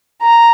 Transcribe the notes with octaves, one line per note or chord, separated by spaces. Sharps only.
A#5